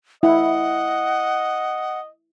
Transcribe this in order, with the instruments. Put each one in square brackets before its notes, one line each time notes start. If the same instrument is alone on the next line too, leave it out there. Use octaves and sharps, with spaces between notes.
[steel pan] E4 [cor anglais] D#5 [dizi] F#5